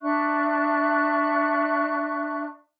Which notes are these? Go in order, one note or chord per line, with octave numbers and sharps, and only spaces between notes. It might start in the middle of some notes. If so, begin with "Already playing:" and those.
D4 E5 C#6 F#6